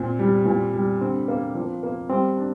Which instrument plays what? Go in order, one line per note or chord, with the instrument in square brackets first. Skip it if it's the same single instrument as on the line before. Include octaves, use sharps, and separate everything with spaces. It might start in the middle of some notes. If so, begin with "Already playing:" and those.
Already playing: [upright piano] A#2 [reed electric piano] C4
[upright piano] G3
A#2
G3
[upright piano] D3 [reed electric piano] C4
[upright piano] A#3
F3
A#3
[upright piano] G3 [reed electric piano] C4
[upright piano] D4